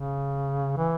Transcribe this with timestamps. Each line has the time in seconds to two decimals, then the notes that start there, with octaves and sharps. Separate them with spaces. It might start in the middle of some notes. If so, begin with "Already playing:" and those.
Already playing: C#3
0.77 E3